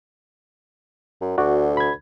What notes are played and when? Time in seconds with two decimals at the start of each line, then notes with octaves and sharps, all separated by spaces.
1.21 F#2
1.38 D2 F#4 D5
1.77 B5 G#6